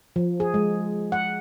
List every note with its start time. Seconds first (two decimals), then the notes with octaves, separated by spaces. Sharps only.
0.16 F3
0.40 G#4
0.54 G#3
1.12 F#5